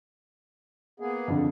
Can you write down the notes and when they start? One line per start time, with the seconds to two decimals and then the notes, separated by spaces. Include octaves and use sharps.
1.00 A#3 B3 G#4
1.28 F2 D3